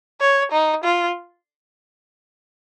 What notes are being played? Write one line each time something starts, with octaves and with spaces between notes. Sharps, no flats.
C#5
D#4
F4